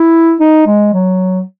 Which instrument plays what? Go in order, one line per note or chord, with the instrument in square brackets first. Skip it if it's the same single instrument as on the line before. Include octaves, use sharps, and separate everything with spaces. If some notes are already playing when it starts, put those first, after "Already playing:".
Already playing: [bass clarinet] E4
D#4
G#3
F#3